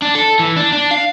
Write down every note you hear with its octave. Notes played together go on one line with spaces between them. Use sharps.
D4
A4
E3
D4
D4
F5